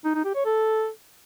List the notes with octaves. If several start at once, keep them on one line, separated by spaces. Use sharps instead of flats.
D#4
D#4
G4
C#5
A4